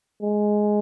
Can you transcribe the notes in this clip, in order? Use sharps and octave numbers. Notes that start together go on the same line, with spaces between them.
G#3